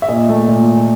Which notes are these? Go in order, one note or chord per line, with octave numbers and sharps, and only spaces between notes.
E5
A#2 D#5
A3
A#2